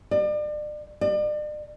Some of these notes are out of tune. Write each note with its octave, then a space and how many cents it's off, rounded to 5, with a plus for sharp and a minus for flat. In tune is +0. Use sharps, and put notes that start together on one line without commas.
D5 +35
D5 +40